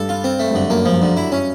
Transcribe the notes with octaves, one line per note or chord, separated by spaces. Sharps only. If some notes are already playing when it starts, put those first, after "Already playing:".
Already playing: G2 A4
F4
C4
A3
G2
F#2 D3
F#2 A#3
G2 F3
G2 D3
E4
C#4